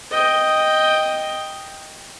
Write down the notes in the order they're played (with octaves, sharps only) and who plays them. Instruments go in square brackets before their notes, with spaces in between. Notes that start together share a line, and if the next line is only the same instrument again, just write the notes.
[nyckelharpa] D#5 G5